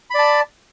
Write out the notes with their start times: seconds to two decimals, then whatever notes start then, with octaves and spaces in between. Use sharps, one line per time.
0.10 B5
0.14 D5
0.19 A5